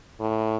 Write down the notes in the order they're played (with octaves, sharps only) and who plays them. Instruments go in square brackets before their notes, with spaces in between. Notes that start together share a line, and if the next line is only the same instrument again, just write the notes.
[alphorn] A2